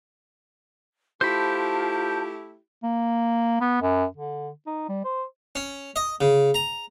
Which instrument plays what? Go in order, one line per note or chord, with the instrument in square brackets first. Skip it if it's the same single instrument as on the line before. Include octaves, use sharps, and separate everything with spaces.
[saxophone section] A3 E4 G4 [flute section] F4 A5 [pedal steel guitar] C5 B5
[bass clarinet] A#3
B3
F#2
D3
D#4
G3
C5
[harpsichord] C#4
D#5
C#3
A#5